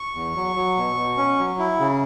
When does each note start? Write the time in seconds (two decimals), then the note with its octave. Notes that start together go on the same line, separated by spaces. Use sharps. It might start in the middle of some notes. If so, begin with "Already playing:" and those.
Already playing: C#6
0.14 E2
0.35 F#3
0.56 F#3
0.77 B2
0.96 B2
1.17 C#4
1.39 F#3
1.59 E4
1.80 C#3